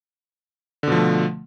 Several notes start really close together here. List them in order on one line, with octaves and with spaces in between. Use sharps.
D3 B2 F3 A3